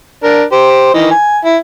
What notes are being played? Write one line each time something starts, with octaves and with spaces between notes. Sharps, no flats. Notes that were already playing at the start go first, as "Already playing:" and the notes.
D4 A#4
G4 C5
D#3 E3 D#5
G#5
E4